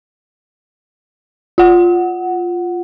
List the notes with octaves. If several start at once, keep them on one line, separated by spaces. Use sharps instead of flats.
F4 F#5